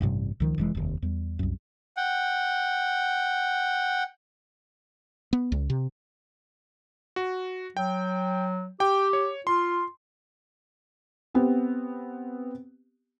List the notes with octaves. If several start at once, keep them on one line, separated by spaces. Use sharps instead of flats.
A1 G2 C3 G3
C#2 D#3 F3
F1 E3 G#3
F1 D#2
E2 G3
C2 F#2
F#5 G5
B3
C#2
C3
F#4
F#3 G5
G4 G5
C#5
F4 C6
B3 C4 G4